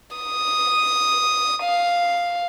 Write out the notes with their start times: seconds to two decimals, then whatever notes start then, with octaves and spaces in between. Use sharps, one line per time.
0.17 D#6
1.63 F5